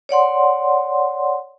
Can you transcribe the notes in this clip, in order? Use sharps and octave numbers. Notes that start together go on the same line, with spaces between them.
C#5 D5 F#5 C6